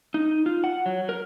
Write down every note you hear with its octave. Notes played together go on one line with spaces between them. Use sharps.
D#4
F4
F#5
F#3
A#4